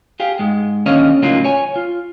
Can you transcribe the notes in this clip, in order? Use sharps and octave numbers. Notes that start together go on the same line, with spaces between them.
G4 G#4 F5
G#2 G#3
D#2 D3 C#4 C#5 D#5 F5
A2 C#3 F#3 A#3 D#4 F4
C#5 G#5
F4